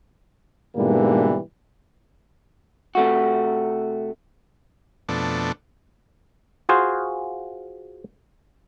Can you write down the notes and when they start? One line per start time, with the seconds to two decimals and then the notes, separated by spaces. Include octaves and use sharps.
0.76 G#2 B2 D3 E3 G3 A#3
2.95 C3 A3 F#4
5.09 F2 B2 A3 D4
6.69 F4 F#4 G#4 C5